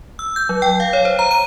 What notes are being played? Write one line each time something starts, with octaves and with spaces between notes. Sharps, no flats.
E6
G6
F#3
G5
F5
C#5
C5
A#5
D#7